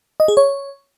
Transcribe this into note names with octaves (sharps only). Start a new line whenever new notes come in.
D#5
G#4
C#5